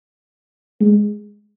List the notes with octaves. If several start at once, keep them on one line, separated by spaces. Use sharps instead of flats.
G#3